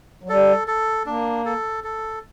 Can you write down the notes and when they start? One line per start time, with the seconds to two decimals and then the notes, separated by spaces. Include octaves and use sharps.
0.24 F#3
0.29 G3 A4
0.68 A4
1.06 A#3 D4
1.45 A4
1.84 A4